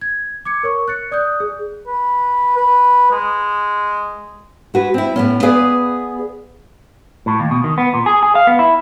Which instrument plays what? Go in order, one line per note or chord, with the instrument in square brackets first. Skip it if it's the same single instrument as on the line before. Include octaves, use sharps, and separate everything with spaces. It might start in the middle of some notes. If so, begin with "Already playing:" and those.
[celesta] G#6
D6 G#6 C#7
A#4 C#5 C#6
F#6 A6 C#7
D5 D#6 F#6 G6
G#4
[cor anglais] B4
B4
G#3
[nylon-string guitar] G#3 F#4 B4
C4 E4
A2 B3 C#4
B3 G#4 B4 D5 F5 G#5
[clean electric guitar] A2
D#2
B2
D#3
B3
A#2
G#4
G#4
F5
B3
E4